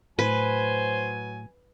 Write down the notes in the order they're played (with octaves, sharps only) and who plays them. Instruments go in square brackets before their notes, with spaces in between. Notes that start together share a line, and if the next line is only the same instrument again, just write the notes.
[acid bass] A2 [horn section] F#3 G#5 [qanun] B4 [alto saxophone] C5